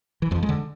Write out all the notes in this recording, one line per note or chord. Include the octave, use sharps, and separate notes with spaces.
E3
F2 F3
G#3
D3